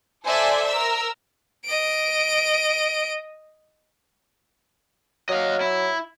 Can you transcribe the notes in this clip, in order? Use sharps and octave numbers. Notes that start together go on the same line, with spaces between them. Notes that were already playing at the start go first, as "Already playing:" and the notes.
A4 C5 D5 E5 G#5
A#4 E6
D#5 D7
F#3 D#5 F5
E4